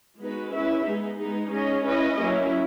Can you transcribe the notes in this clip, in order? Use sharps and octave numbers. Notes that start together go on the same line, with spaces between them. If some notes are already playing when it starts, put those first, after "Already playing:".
G#3 B3 D#4 F#4 B4
C#4 E4 B4 E5
G#3 B3 D#4 G#4
G#3 B3 D#4
C#4 G#4 D#5
C#4 E4 B4 D#5
F#3 A#3 C#4 E4